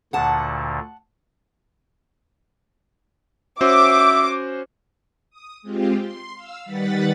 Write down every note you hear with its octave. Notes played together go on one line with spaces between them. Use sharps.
D2 A#2 D3 F#5 A5
C#4 F#4 C5 E5 D6
D#6
G#3 C4 F4 G4
C6
F5 E6
D#3 G3 B4 F#5 B5 A6